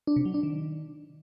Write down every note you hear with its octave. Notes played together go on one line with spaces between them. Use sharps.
D4
C3
F#3
D4
D#3